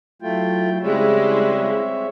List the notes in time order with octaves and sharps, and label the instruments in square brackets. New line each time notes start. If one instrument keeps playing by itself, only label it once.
[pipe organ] F#3 E4 G5 [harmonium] A3 F4
[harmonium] C#3 G3 [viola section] G#3 E4 [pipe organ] C4 C#5 E5